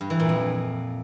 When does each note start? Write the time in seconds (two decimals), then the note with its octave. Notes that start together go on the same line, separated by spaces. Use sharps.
0.01 G2
0.10 E3
0.20 A#2
0.29 F2